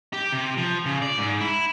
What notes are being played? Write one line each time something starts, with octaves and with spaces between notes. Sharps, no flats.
G4
C3
F3
C#3
D5
G#2
E4